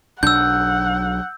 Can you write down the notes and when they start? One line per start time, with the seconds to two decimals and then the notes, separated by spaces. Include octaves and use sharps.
0.23 B1 F#3 D4 F#5 E6 G6